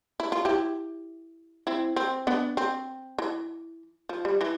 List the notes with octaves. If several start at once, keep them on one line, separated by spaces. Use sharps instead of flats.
E4
F4
E4 G4
C4 E4
C4
B3 D4
C4
E3
F3
G3
E3